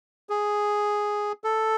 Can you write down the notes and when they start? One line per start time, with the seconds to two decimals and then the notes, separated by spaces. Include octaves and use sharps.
0.29 G#4
1.44 A4